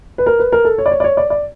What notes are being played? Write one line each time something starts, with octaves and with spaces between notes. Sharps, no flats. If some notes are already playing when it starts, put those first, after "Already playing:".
B4
A#4
B4
A#4
A4
C#5
D5
C#5
D5
C#5
D5
D5